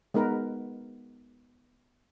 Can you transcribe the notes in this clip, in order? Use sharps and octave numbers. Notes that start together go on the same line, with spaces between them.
G#3 B3 D#4 A#4 B4